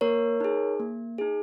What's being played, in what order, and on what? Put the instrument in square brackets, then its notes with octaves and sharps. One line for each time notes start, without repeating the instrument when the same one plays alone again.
[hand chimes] A#3 A#4 C#5
D#4 G#4
A#3
D#4 G#4